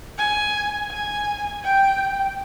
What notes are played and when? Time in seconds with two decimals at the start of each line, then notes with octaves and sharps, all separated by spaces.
0.18 G#5
0.91 G#5
1.64 G5